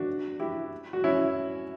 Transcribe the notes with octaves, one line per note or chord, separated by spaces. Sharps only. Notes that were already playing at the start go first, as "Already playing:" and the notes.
Already playing: D4 F#4
E4 G4
F#4
C#4 E4